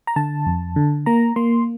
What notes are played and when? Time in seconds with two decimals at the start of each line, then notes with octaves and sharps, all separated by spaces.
0.07 A#5
0.16 D3 A5
0.46 F2
0.76 D3
1.06 A#3 A#5
1.36 A#3 C6